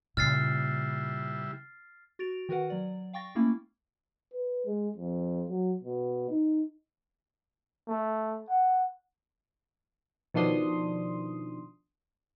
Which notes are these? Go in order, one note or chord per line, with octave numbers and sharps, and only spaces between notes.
A#2 C#3 G3 E4 F6 A6 C7
F#4 A6 D7 F7
D#3 F#4 A#4 B4 F#5
F#3 D5
F5 G5 C#6 A6 A#6
A3 A#3 C#4 E4
B4
G#3
F2
F#3
B2
D#4
A3
F#5
B2 D#3 F3 D4 C6 D#6